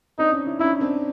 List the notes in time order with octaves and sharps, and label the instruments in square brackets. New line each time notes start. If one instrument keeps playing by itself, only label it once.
[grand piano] C4 D4 [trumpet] D#4
[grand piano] C#4 D#4
D4 E4
[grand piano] C#4 D#4 [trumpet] E4
[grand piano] C4 D4